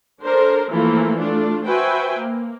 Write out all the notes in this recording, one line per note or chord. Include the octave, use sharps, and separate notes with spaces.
D4 A4 A#4 C5
E3 F3 A3 A#3 F4
A3 D4 F4
F#4 B4 C5 E5 G5 G#5
A#3